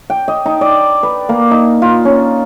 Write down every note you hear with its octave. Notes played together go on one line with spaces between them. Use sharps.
G5
D#5
D#4
D5
B4
A#3
D#4
F4
C#4